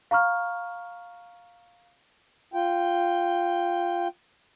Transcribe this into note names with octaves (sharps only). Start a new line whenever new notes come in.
F5 A#5 C#6 F6
F4 G5